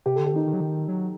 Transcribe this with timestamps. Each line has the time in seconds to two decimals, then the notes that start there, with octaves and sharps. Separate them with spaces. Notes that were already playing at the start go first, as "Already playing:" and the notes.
0.06 C3 G4
0.16 D3 A4
0.26 G4
0.33 D#3 D#4
0.46 D#3
0.53 F#3
0.61 D#3
0.88 F#3